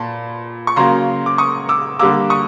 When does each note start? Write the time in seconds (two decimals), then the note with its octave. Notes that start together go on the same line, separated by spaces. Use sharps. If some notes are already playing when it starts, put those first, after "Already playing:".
Already playing: A#2 A5 B5
0.67 C#6
0.76 C#3 F#3 A#3 A#5 C6
1.26 D6
1.38 C#6 D#6
1.69 D6 E6
1.99 D3 G3 A#3 D6 E6
2.30 C#6 D#6